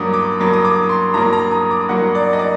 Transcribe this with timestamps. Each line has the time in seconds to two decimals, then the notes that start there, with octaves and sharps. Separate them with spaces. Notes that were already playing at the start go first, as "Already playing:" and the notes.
Already playing: G2 F#3 A#3 D6 D#6
0.14 D6
0.40 G2 F#3 A#3
0.53 D#6
0.65 D6
0.89 C6
1.14 G2 F#3 A#3 A#5
1.33 A#5
1.51 D#6
1.71 D6
1.89 G2 F#3 A#3 F#5
2.15 D5
2.33 D#5
2.39 D5